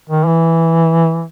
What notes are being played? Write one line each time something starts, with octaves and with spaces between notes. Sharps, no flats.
D#3
E3